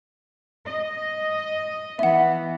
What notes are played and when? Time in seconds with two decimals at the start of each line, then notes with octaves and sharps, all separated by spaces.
0.66 D#5
1.99 E3 B3 E5 F#5